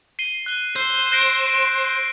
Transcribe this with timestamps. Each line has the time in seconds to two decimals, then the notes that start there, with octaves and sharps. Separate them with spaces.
0.19 C7 D#7 G7
0.46 F#6 G7
0.76 C5 E6 C7
1.12 F#6 A#6 D7